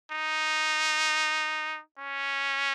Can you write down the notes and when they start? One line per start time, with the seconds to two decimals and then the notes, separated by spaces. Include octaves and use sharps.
0.12 D#4
1.99 C#4